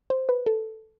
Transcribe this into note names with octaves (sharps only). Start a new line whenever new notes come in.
C5
B4
A4